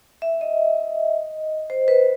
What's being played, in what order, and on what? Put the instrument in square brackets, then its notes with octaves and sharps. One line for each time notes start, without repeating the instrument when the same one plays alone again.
[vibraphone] E5
D#5
C5
B4